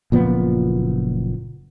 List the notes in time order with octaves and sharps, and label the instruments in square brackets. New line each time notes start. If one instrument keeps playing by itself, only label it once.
[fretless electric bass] F#1 A#2 F3 B3